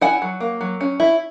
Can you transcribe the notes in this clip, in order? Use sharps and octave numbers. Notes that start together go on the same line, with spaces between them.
E4 F#5 G#5
F#3
A#3
F#3
C#4
E4